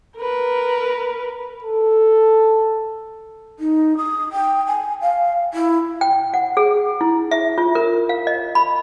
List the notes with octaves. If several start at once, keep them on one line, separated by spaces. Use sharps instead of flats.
A#4 B4
A4
D#4
D#6
G5
G#5
F5
E4
G5
F#5
G#4
E4
E5
F4
A#4
F5
D#5
B5